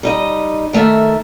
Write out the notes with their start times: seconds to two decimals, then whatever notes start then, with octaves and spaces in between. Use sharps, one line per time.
0.03 G3 D#4 D#5
0.73 D#3 A3 A#4 E5